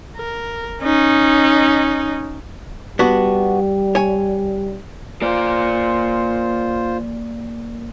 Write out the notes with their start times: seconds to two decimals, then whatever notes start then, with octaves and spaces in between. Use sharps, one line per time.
0.17 A#4
0.82 C#4 D#4
2.99 G3 B3 D4 F#4
3.95 C#5 G#5
5.22 A#3 F4 C5 D5